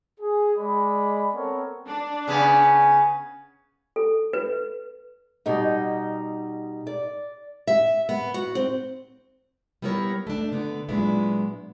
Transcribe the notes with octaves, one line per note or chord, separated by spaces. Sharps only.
G#4
G#3 D5 D#5 B5
B3 C4 A4 A#4 C#5
D4
C#3 B3 G#5
A4
B4
B2 G3 D#4
D5
E5
B3
F#4
C4
G3 B3 E4 A#4 C#5
A3 D4
D3 B3
A#2 F#3 G#3 B3 D4 E4